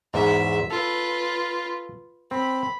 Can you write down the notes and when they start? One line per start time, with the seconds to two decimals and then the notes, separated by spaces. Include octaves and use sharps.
0.14 E2 G#2 E5
0.70 F4 A4 B4
2.31 C4 B5